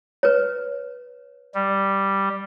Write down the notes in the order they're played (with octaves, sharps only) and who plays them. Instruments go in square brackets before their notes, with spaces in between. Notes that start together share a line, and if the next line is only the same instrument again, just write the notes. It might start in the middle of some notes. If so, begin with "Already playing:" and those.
[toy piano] B4 C#5
[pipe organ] G3